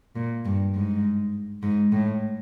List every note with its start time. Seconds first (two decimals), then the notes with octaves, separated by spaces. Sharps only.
0.16 A#2
0.45 G2
0.74 G#2
1.63 G#2
1.92 A2